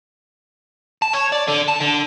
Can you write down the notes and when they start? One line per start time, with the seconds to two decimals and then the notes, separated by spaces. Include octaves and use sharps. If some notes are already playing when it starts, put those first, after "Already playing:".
1.02 A5
1.13 C#5
1.32 D5
1.48 D3
1.68 A5
1.81 D3